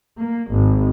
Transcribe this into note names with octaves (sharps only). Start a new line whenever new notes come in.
A#3
G#1